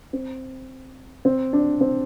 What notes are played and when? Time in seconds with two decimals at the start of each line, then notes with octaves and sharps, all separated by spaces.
0.13 C4
1.25 C4
1.53 D4
1.81 C4